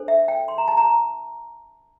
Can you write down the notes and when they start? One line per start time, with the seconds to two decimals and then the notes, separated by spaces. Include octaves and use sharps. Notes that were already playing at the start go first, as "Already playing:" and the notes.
Already playing: D4 A4 C5
0.08 E5
0.28 G5
0.48 C6
0.58 A#5
0.68 A5
0.77 A#5